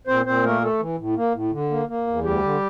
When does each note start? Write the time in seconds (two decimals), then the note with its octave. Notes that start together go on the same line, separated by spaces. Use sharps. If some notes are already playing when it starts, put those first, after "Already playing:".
0.07 A#2 C4 C5
0.25 A#2 C4 C5
0.44 A3 A#3 A#4
0.62 A3 A4
0.80 E3
0.98 A2
1.17 A#3
1.34 A2
1.52 D3
1.71 A#3
1.89 A#3
2.07 E2
2.24 D2 G3 G4
2.43 D3